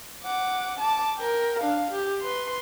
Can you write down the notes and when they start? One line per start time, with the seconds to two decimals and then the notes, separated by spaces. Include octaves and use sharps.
0.24 F#5 D6
0.80 A5 D6
1.17 A#4 G5
1.60 D4 F5
1.91 G4
2.21 B4 C6